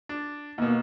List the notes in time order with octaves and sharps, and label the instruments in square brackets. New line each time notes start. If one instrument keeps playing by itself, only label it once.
[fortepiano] D4
[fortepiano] D#2 B2 [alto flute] A#3